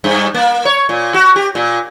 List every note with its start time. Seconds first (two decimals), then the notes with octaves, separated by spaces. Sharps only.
0.04 G2
0.34 A#3
0.65 C#5
0.89 A#2
1.14 F#4
1.36 G4
1.55 A#2